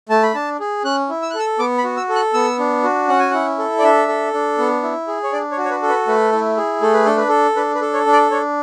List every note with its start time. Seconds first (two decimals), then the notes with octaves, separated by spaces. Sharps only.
0.09 A3 A5
0.23 B5
0.34 D4 A5
0.60 G#4
0.84 C#4 F#6
1.09 E4
1.22 E6
1.30 F#6
1.35 A4 E6
1.59 B3 D6
1.78 B5
1.84 F#4
1.97 E6
2.09 A4
2.15 F#6
2.34 B3 E6
2.59 D4
2.83 F#4
3.08 C#4 F#5
3.20 G#5
3.31 E4 F#5
3.58 A4
3.79 D5
3.83 D4 E5
4.08 A4
4.34 D4
4.58 B3
4.83 E4
5.07 G#4
5.24 C#5
5.33 D4 D5
5.51 C#5
5.57 F#4
5.65 C#5
5.70 B4
5.83 A4
5.89 B4
6.07 A3 B4
6.33 E4
6.57 G#4
6.81 A3 A4
6.94 B4
7.05 D4 A4
7.17 B4
7.28 A4
7.56 D4 B4
7.75 B4
7.81 A4
7.94 C#5
8.06 D4
8.13 D5
8.31 D4 C#5